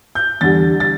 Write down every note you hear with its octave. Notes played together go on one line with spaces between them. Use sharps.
G6
E2 D3 G3 A6
A6